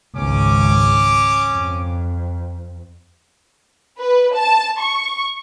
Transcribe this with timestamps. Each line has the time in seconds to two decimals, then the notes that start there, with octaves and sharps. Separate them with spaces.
0.15 G#1 C#2 C#4 D6
1.53 F2
3.99 B4
4.35 A5
4.80 C#6